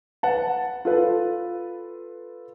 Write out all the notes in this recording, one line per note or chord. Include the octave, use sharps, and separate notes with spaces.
B4 F#5 A5
F4 A4 B4